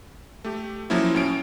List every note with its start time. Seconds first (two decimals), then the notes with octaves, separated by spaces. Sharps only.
0.44 A3 G4
0.90 F3 F#3 A#3 C#4 E4
1.15 A2 C#4 D7